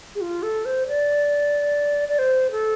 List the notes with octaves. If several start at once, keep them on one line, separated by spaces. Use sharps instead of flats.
G#4
F4
A4
C5
D5
D5
C5
A4